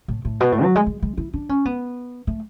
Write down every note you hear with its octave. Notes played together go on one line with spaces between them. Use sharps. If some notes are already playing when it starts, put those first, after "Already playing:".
A2
A2
B2
A2
F#3
G#3
G#3
G#3
E4
D4
C#4
B3
A3